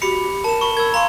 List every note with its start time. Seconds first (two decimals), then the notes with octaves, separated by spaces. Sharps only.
0.02 F#4 G4 B5 C#7
0.44 A#4 A5 E7
0.61 B5 C#6
0.77 A#4 E6 G#6
0.94 F5 A#5 C6 C#6